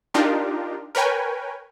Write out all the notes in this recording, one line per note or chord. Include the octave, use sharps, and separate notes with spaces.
D4 D#4 F4 G4 A#4
A#4 B4 C#5 G5 G#5